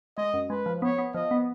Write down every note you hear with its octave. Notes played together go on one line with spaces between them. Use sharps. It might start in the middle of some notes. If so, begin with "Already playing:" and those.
G#3 D#5
F#2
G#3 B4
F3
B3 C#5
B3
F3 D#5
B3